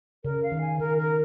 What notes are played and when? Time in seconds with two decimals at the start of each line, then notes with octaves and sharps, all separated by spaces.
0.24 C#3 A#4
0.43 F5
0.52 D#3
0.61 G#5
0.79 D#3 A#4
0.98 A#4